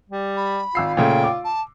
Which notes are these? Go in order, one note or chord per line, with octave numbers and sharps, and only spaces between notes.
G3
B5
G#1 F4 E6 C7
A#2 C#3 A3 G5
D6
A5